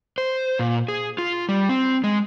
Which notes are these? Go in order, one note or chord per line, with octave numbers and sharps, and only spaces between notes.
C5
A#2
G#4
F4
G3
C4
G#3